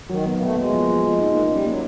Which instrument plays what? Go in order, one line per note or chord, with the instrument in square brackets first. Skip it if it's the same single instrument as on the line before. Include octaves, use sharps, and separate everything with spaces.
[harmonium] D#3 [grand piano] F#3
[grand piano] B3
[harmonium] A#3
[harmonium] A3 [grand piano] B3
[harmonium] G#3 [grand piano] A#3
[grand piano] F3
F3
F3
D#4
A#3
[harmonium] G3 [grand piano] C#4
[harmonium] F#3 [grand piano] A#3